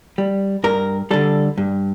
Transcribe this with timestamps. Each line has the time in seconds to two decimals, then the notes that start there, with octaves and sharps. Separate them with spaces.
0.18 G3
0.64 G2 A#4
1.11 D3 G3 A4
1.58 G2